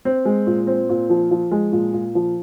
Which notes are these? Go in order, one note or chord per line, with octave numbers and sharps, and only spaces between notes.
C4
G#3
A#2
C4
A#2
F3
F3
G#3
A#2
A#2
F3